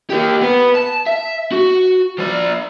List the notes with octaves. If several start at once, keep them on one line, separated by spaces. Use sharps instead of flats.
A#3 G4
B3 B4
A5
E5
F#4
F3 D5